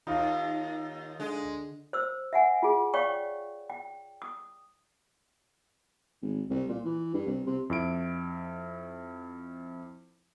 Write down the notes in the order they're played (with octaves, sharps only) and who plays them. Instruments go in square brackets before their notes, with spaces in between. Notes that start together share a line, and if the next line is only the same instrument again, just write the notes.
[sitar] D#2 [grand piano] D#4 F4
[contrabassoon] D3 [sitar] G#3
[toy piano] C5 E6
E5 F#5 G#5
F4 G#4
C#5 D5 F5 G5 C#6
G5
D#6
[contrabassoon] G#1
C2
A#2
E3
G2
C2
C3
[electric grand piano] F2 E4 D7